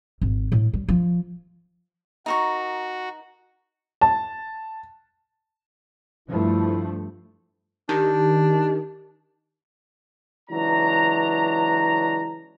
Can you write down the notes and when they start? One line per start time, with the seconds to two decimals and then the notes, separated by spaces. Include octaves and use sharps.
0.22 G#1
0.52 A2
0.73 G3
0.89 F3
2.26 D#4 F#4 A#4 C#6
4.01 A5
6.28 G2 F3 A3 E4
7.89 D#3 D4 G4
10.50 C#2 E3 F#3 D4 A#5